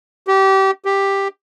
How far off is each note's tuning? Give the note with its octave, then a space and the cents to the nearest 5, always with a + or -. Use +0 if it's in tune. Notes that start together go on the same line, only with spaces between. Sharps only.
G4 -25
G4 +5